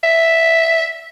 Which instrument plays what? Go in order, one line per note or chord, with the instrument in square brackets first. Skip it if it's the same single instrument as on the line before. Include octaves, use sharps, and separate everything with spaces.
[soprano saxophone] E5